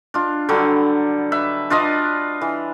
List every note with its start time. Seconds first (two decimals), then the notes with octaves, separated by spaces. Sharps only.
0.14 D4 F4
0.49 D3 F#3 G3
1.32 B4 E5
1.70 D4 F4 B4 D#5
2.41 E3